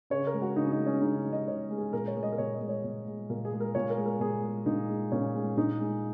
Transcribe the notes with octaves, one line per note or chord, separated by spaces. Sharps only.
C#3 C#5
A#4
G#3
F#4
C#3 D#4
D#4
G#3
C#4
C#3 D#4
G#3
D#5
C#3 C#5
G#3
G#4
A#2 A#4
C#5
G#3
D#5
A#4
A#2 C#5
D#5
G#3
C#5
A#2
G#3
A#2 A#4
G#4
G#3
A#4
A#2 C#5
A#4
G#3
A#4
A#2 G#4
G#3
A#2 D#4
G#3
A#2 C#4
G#3
A#2 D#4
G#3